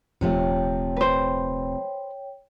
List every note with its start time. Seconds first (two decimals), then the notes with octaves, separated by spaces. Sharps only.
0.21 D#1 C3 F3 A3 C#5 G5
0.97 B4 C5